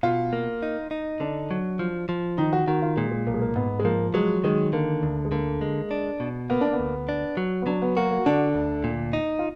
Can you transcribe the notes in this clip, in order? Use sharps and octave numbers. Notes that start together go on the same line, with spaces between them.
B2 F4
A#3
D#4
D#4
D3 D4
F#3
F3
F3
D#3 D#4
F#4
D#3 F#4
F4
A#2 G#3
G#3
B1 A#3
G#3
A#3
G#2 B3
G#3
F3 A#3
F#3 G#3
D#3 G#3
D3 A#3
D2
G#3
D3 A#3
G#3
D4
B2
A#3 B3
D4
B3
D2
D4
F#3
B3
F#3 D4
B3
A#3 F#4
A#3
D3 D4
D2
A#2
D#4
F4